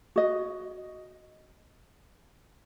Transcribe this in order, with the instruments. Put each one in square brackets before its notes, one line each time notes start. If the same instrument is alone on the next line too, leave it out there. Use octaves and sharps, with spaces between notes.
[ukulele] F#4 D#5